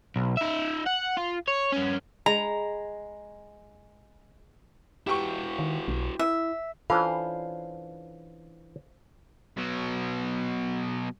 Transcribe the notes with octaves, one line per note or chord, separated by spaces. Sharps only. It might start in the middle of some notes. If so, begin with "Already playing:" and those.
B1
D#4 E5
F#5
F4
C#5
G2 C#4
G#3 A#5
E4 F#4 G4 B4 C#6
D#3
B1
E4 E5
E3 C#4 D4 F4 A4 C5 F5 A5
B2 F#3